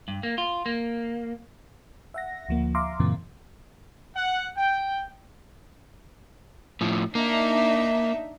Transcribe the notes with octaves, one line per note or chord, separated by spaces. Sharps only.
G2
A#3
F4
A#3
E5 F#5 A#6
D2 F3 A#3
E5 F5 A#5 C6 D6
F#2 A#2 C#3 E3 A#3 C4
F#5
G5
A2 F3
A#3 D4 D#4 E5